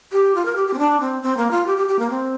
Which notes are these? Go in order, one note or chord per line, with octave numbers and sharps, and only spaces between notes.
G4
F4
A#4
G4
G4
C4
D4
C4
C4
A#3
F4
G4
G4
G4
A#3
C4